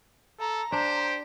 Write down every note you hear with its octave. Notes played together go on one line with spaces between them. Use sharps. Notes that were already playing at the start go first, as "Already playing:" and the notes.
A4 A#5
D4 G4 C5